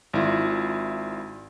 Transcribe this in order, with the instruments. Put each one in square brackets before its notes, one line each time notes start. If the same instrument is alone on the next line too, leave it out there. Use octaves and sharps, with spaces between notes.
[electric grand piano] G#1 E4 F4